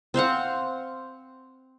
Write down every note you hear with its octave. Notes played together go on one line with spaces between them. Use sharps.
C4 C5 F5 F#5